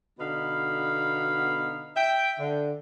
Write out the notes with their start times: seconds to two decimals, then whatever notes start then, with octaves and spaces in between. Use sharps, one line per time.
0.19 B2 D3 B3 D#4 F5 B5
1.96 E5 G5
2.39 D3